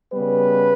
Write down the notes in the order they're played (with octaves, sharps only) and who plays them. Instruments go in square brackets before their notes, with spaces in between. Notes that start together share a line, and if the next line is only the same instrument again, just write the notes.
[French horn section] C#3 G3 B3 B4